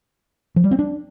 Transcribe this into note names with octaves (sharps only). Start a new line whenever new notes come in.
F3
G3
C4
D4